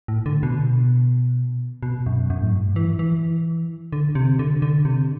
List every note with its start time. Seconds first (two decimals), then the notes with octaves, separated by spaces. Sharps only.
0.08 A2
0.26 D3
0.43 B2
1.83 B2
2.06 F#2
2.30 F#2
2.42 A2
2.52 G2
2.76 E3
2.99 E3
3.93 D3
4.15 C3
4.39 D3
4.62 D3
4.85 C3